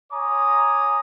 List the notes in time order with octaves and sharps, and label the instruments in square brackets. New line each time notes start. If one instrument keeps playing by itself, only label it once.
[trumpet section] C#5 G#5 A#5 D6 D#6